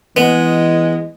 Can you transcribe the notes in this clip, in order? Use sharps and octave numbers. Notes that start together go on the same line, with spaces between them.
E3 G#3 B3 D#5